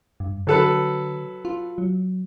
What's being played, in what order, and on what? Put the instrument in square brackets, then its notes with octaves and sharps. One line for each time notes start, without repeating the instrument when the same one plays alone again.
[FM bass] G2
[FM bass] D3 [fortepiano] F#3 A4 B4
[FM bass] F4
F#3